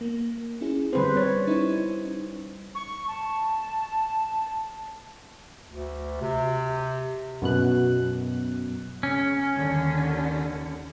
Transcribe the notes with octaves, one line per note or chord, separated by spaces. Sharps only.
A#3
C#4 E4 G#4
D3 G3 C4 B4 C5
C#5 A6
C#4 D#4 E4
C#6
A5
D2
C3
F#2 B2 F#6
C#3 C#4
D#2 D3 D#3